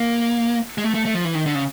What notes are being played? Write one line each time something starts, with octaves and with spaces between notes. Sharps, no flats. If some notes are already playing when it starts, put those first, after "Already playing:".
Already playing: A#3
G#3
A3
A3
A3
F3
E3
D#3
D3
C#3